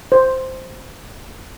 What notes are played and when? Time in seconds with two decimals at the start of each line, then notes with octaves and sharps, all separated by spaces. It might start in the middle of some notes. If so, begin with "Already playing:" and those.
0.12 C5